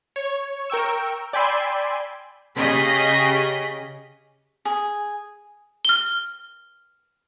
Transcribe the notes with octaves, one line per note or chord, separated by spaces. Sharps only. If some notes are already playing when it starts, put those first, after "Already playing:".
C#5
A#4 G5 C#6 E6
D5 G5 G#5 B5 C6 E6
C#3 C#4 G4 G#4 D#5 B6
G#4
F6 G7